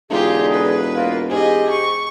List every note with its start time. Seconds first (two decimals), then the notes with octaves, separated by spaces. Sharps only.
0.10 E1 D3 D#4 F4 G4 G#4
0.52 B4
0.96 A#3 F4
1.30 G#2 G4 G#4 D#5
1.70 C#6